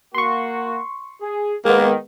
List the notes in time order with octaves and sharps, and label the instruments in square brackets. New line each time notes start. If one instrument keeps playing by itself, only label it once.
[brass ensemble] A#3 F#4 [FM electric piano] C6 C#6
[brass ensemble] G#4
[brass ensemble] D#3 [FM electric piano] G#3 B3 [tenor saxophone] A#3